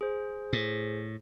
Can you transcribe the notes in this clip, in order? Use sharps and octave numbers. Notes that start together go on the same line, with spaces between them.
G#4 C5
A2